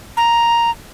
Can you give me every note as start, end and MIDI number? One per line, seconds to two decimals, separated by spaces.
0.17 0.71 82